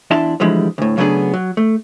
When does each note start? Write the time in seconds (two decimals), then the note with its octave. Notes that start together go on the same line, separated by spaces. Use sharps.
0.11 E2 D4 E4 E5 A5 C6
0.40 D3 E3 F3 G3 G#3 E4
0.78 D2 A2
0.98 C#3 F#3 A3 B3 D4 G#4
1.34 F#3
1.57 A3